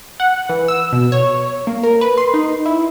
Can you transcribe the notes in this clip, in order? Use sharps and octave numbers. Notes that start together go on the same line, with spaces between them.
F#5
E3
E6
B2
C#5
A#3
A#4
B4
C6
D#4
E4